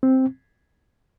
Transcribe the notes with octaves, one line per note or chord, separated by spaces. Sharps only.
C4